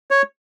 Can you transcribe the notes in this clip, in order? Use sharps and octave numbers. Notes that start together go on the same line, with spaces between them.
C#5